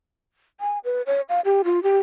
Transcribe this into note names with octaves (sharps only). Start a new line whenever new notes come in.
G#5
B4
C#5
F5
G4
F4
G4